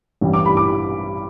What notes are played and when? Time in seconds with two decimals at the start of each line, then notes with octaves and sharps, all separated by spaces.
0.21 A1 G2 E3 G3
0.34 D6
0.46 B5
0.57 D6